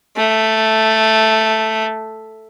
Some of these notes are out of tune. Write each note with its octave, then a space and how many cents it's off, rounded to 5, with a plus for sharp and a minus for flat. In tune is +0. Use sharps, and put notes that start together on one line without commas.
A3 +0